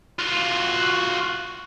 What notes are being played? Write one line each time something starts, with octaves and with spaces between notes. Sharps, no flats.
F4 F#4